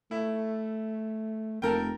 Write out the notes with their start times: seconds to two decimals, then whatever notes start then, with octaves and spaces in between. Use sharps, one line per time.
0.11 A3 E4
1.62 F1 A#3 A4 A#4 G5